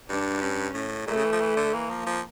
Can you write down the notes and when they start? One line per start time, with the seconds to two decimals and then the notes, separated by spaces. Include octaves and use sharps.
0.09 G2 D4
0.41 C#4
0.74 A2
1.07 A#2 A3
1.16 C#3
1.24 E3
1.32 F3
1.41 E3
1.57 D3
1.73 E3 A#3
1.90 F3
2.06 F3